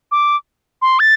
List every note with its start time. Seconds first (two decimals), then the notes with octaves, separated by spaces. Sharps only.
0.12 D6
0.82 C6
1.00 A6